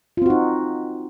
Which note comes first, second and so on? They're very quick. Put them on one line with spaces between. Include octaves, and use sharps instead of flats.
F4 C4 F#4 D#4